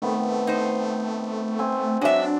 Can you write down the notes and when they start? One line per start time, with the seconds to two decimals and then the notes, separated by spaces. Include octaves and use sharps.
0.02 D#3 A3 B3 C4
0.47 D#4 C5
1.59 C4 G#5
2.01 F#3 G#3 D4 D5 E5